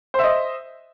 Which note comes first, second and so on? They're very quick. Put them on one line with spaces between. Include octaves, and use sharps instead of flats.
C5 E5 D#5